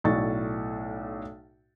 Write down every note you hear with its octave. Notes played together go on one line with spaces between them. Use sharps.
B1 A2 D5 C#6 A6